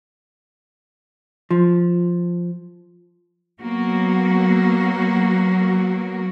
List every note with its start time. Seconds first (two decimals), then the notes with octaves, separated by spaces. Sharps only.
1.51 F3
3.62 F#3 A#3 B3 F#4